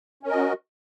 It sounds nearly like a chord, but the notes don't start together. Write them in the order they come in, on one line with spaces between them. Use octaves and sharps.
C#4 A#4 D#5 F#4